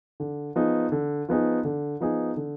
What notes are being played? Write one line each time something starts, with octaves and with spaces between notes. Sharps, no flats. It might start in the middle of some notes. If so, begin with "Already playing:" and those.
D3
F3 B3 D#4 G#4
D3
F3 B3 D#4 G#4
D3
F3 B3 D#4 G#4
D3